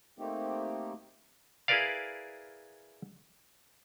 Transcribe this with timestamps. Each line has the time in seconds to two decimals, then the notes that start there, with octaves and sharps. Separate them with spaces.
0.19 A3 A#3 C4 D#4 G4
1.68 E4 G#4 A#4 B4 D5 F5